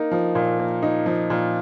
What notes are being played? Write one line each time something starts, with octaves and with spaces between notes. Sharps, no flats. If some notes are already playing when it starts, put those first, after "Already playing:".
Already playing: A#3 D#4
F3
A#2
A#3
D#4
F3
A#2